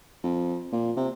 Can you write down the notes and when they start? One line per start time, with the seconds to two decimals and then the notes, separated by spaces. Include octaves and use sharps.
0.24 F2
0.72 A#2
0.97 C3